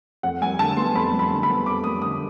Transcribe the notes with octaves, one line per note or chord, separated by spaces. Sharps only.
F2 F#5
G3 G#5
D3 A5
B3 C6
F2 B5
G3
B5
D3
B5
B3
F2 D6
G3 D#6
D3 D#6